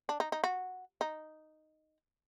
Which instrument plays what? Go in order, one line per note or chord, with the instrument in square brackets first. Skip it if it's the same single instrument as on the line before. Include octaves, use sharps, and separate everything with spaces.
[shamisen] D4
D#4
D#4
F#4
D#4